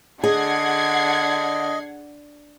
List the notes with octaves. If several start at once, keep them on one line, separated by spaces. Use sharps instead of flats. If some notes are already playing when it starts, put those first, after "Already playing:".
D3 G#4 D#5 F#5 G#6 C7